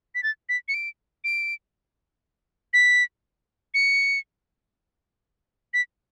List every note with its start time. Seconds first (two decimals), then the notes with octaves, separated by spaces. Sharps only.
0.15 B6
0.23 A6
0.49 B6
0.68 C#7
0.74 D7
1.24 D7
2.73 B6
3.74 C#7
5.74 B6